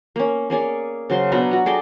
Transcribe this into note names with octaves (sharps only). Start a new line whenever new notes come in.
A#3 C#4
A#3 C#4 G#4 D5
C#3 F#3 C5 C6
B2 B3 D4 A#5
F#4 A#5
G#4 A4 D5 G5